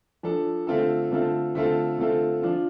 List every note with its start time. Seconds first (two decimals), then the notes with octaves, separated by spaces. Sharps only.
0.23 F3 D4 A4
0.67 D3 A3 C4 F4 A4
1.11 D3 A3 C4 F4 A4
1.55 D3 A3 C4 F4 A4
1.98 D3 A3 C4 F4 A4
2.42 F3 D4 F4